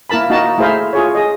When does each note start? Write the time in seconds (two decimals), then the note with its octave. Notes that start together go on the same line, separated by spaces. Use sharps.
0.10 A#3 E4 A#4 A5 B5
0.30 A#3 D#4 F#4 D#5 A5
0.58 A3 E4 G#4 C5 E5 F5
0.93 F4 G#4 C#5
1.15 G#4 D#5